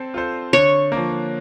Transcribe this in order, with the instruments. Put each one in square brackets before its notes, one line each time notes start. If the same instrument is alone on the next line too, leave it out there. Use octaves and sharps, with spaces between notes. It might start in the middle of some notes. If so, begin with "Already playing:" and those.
Already playing: [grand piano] C4 A4 C5
F4 A4 C5
[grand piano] D3 [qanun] C#5
[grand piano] A#3
F3